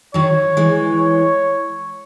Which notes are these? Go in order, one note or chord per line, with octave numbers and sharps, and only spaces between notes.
D#3 F#3 C#5
E3 G#3
C#5